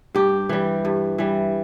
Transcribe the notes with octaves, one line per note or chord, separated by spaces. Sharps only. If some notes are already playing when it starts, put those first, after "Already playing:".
G2 G4
E3 G3
G2
E3 G3